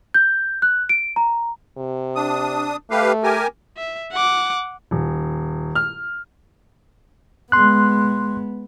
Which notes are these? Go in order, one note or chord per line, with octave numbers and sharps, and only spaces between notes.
G6
F#6
D7
A#5
C3
D4 D#6
A3 G4 B4 F5
G4 A#4 G#5
E5
F#5 D6
D#1
F6
G#3 B3 C6 F#6